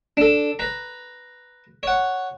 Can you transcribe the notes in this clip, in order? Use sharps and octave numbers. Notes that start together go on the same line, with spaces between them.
D4 A4
B4 A#5
C#5 F#5